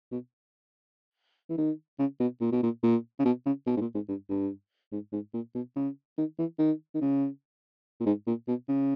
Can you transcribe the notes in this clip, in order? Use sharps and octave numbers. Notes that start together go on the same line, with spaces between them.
B2
E3
D#3
C#3
B2
A#2
B2
A#2
A#2
C#3
B2
C#3
B2
G#2
A#2
G#2
G2
G2
G#2
G#2
A#2
B2
C#3
D#3
E3
D#3
D#3
C#3
A#2
G#2
A#2
B2
C#3